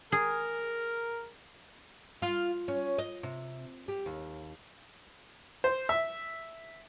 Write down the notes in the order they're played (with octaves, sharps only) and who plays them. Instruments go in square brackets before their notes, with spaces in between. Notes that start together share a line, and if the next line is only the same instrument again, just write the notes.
[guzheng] G#4 [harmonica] A#4
[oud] F4
C#4
D#5
C3
G4
D#2
[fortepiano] C5
E5